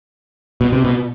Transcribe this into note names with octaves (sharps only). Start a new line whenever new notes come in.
B2
C3
B2